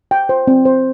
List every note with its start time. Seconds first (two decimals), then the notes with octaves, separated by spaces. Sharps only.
0.11 G5
0.29 C5
0.47 C4
0.65 C5